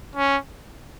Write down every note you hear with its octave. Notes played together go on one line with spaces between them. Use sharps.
C#4